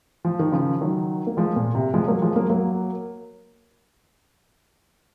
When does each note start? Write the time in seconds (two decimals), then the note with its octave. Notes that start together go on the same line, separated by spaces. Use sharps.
0.25 F3
0.39 D#3
0.52 C#3 F3
0.81 D#3 F#3
1.27 A#3
1.37 F3 G#3
1.56 A#2
1.75 C3
1.94 F3 G#3
2.08 F#3 A#3
2.22 F3 G#3
2.36 F#3 A#3
2.50 F#3 A#3